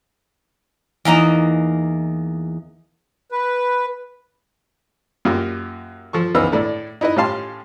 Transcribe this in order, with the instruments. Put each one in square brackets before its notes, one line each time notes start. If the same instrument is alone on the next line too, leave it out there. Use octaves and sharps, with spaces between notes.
[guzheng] E2 A#3 D#4 A#5
[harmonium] B4
[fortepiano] F#2 A#3 F4 G4
F3 A4 C#6
C#2 E3 B3 D#4 C5 E6
A2 D4 E4 A4
D#4 E4 B4 D#5
A2 C#4 G4 F5 A5 C6